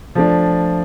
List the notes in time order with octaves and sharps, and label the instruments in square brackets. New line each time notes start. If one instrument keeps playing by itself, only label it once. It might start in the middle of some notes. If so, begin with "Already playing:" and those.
[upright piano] F3 A3 D4